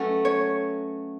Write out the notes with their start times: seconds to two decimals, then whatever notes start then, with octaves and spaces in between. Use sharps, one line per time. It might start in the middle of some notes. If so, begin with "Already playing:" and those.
Already playing: F#3 A3 C#4 F#4 B4
0.25 C#5